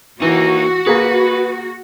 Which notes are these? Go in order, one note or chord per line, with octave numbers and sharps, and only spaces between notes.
E3 A#3 D#4 F#4
A#3 G#4 B4